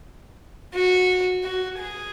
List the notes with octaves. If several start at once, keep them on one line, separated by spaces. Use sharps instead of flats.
F#4
F#4
G#4